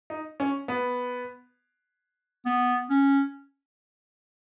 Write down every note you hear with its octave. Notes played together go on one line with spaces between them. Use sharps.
D#4
C#4
B3
B3
C#4